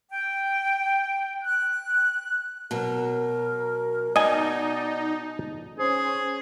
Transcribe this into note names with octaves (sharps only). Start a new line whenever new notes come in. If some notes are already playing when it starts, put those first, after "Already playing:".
G5
F#6
B2 F#3 A#4
B2 D#4 D5 D#5 G#5
C#4 G#4 C5